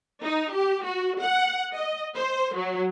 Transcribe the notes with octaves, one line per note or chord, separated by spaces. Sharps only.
D#4
G4
F#4
F#5
D#5
C5
F#3